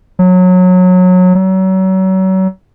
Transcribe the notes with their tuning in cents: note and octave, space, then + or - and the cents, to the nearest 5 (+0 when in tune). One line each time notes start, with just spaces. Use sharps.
F#3 -20
F#3 +35